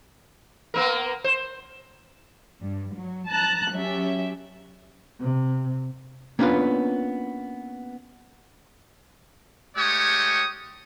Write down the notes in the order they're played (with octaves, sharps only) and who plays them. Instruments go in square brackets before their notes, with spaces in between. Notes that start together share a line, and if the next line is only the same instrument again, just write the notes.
[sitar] A#3 B3 A#4
C5
[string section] G2
F#3
A5 A#5 F#6
F#3 C#4 G4 E5
[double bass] C3
[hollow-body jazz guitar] A#3 B3 C#4 D4 F4 B4
[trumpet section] G#3 A3 G4 C#5 C#6 D#6